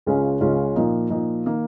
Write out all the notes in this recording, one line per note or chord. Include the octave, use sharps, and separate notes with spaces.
C#2 C#3 G#3 C#4 F4
C#2 C#3 G#3 C#4 F4
A#2 F3 A#3 D#4
A#2 F3 A#3 D#4
D#3 A#3